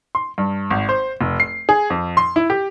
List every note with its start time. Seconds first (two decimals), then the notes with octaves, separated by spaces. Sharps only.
0.15 C6
0.38 G2
0.70 G#1
0.89 C5
1.21 F1
1.40 C7
1.69 G#4
1.90 F2
2.17 C6
2.36 E4
2.50 G4